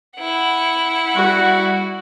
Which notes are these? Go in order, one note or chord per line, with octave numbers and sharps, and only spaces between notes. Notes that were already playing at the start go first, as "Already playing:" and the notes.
E4 F#5
G3 F#4